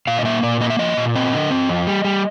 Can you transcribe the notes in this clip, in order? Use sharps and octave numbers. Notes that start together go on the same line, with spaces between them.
A#2 F5
D#5
A#3 E5
A#2 D5
A#3 D#5
E5
F3 D#5
A#2
C4 D#5
D3
C4
F2
G3
G3